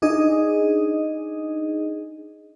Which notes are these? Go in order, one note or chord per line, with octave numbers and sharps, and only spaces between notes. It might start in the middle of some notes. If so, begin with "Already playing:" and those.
D4 D#4 G#4 D#5